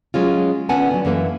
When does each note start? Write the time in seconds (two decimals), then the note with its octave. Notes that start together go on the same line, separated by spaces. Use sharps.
0.14 F#3 G#3 C#4 F4
0.69 D3 B3 C#4 F#5 G#5 A5
0.91 D3 F#3
1.05 F#2 E3 A#3 A4 B4